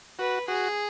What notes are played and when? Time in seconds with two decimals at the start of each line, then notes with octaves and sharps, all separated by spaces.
0.19 F#4 B4
0.48 F#4 G#4